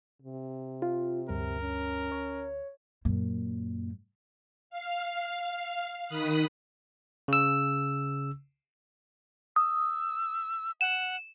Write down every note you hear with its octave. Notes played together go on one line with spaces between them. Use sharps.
C3
F4
D2 G2 A#4
C#4
C#5
F#2 A#2
F5
D#3 B5 D#6 F#6
C#3 E6
D#6 E6
F#5 E7